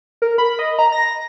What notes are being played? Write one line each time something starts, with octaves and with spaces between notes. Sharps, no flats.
A#4
B5
D#5
A#5
A#6